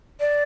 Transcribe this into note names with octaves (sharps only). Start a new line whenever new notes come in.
D5